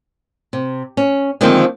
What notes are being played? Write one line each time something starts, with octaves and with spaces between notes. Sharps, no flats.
C3
C#4
D3 D#3 F3 G#3 A#3 C4